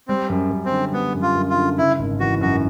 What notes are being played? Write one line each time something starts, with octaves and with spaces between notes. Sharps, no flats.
G3 C4
F#2
F#2
C4
D3
G3 B3
F#2
F4
F#2
F4
D3
C#3 E4
G#1
E3 F#4
F#2 F#4